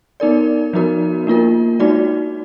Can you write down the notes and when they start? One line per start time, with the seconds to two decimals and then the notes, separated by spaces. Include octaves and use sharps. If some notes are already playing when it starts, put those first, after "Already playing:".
0.20 B3 D#4 A#4 D5
0.73 F3 B3 D#4 F#4 A#4
1.27 A#3 D4 F4 A#4
1.80 G#3 D#4 F#4 D5